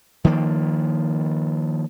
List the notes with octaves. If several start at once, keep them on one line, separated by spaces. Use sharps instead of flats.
D#3 F3 A#3